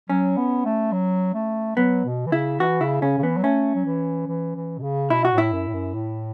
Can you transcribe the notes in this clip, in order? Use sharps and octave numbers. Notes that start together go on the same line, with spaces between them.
F#3 C#4
B3
A3
F#3
A3
F#3 B3
B2
E3
C#3 E4
E3 F#4
C#3 E4
C#3 C#4
C#3
E3 B3
F#3
A3 C#4
F#3
E3
E3
E3
B2
C#3
B2 E4
F#4
A2
E4
F#2
A2
F#2
A2